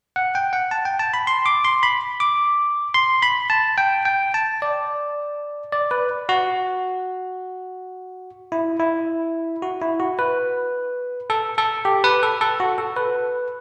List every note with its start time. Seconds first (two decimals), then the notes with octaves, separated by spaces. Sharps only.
0.16 F#5
0.35 G5
0.53 F#5
0.71 A5
0.85 G5
0.99 A5
1.14 B5
1.27 C6
1.46 D6
1.65 C6
1.83 B5
2.20 D6
2.94 C6
3.22 B5
3.50 A5
3.78 G5
4.05 G5
4.34 A5
4.62 D5
5.73 D5
5.91 B4
6.29 F#4
8.52 E4
8.80 E4
9.62 F#4
9.82 E4
10.00 F#4
10.19 B4
11.30 A4
11.58 A4
11.85 G4
12.04 B4
12.23 A4
12.41 A4
12.60 F#4
12.78 A4
12.96 B4